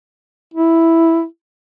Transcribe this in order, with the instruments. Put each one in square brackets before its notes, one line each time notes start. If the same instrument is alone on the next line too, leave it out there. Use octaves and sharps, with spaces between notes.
[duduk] E4